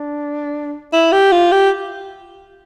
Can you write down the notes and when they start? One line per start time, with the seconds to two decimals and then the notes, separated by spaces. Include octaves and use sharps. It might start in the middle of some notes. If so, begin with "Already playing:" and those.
Already playing: D4
0.93 E4
1.12 G4
1.32 F4
1.52 G4